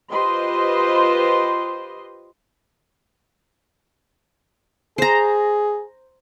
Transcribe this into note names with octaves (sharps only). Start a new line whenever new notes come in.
F4 G4 B4 C5 D#5 C6
G#4 C5 A#5